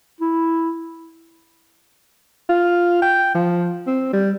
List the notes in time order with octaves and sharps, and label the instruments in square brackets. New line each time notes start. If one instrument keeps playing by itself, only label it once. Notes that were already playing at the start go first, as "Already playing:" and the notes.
[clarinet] E4
[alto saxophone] F4
G5
F3
C4
G3